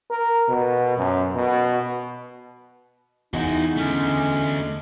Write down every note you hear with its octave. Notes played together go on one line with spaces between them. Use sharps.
A#4
B2
F#2
B2
E2 G#3 D#4 E4 F#4
D3 A3 C#4